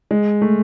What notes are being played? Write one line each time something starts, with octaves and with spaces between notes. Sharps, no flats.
G#3
A3